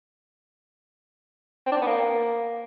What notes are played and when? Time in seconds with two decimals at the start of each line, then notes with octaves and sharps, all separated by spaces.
1.67 C4
1.72 D4
1.77 C4
1.82 B3
1.87 A#3